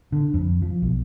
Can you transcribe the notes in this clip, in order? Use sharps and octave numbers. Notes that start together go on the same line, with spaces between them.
D3
F2
F3
B1